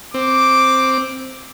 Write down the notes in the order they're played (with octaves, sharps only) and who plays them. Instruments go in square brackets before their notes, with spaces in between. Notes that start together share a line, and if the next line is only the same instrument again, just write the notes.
[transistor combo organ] C4 [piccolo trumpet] D6